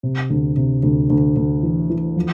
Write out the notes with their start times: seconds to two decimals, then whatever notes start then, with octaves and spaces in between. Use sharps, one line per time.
0.03 C3
0.30 D2
0.57 C3
0.83 D2
1.10 D2
1.37 D2
1.63 E3
1.90 E3
2.16 F3